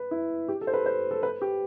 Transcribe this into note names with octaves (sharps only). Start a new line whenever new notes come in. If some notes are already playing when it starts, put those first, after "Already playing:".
Already playing: B4
E4
G4
A4
C5
B4
C5
A4
B4
G4